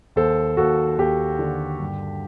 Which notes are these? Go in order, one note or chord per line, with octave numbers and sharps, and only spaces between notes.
D#2 A4 C5
D#2 F#4 A4
D#2 G4
D3
G2